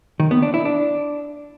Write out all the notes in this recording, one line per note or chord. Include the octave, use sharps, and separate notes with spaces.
D#3
B3
D4
E4
D4